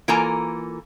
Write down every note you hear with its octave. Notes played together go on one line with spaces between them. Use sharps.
E3 A#3 F4 A4 G#5 A#5